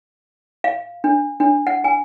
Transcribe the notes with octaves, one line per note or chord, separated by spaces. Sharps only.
F5
D4
D4
F#5
G#5